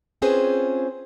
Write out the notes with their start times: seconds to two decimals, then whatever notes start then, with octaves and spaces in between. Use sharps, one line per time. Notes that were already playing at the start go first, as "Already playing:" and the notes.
0.22 C4 C#4 F4 G#4 B4 C5